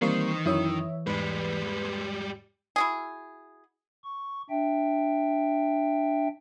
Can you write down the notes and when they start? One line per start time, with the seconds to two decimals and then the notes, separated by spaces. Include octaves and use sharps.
0.02 D#3 E3 G3 A#3 C4 C5 C#6 C7
0.46 F#2 E4 C#5 E5 D#6
1.07 E2 G#2 G3 G#3 B4
2.76 E4 F#4 G#4
4.04 C#6
4.50 D4 E5 G5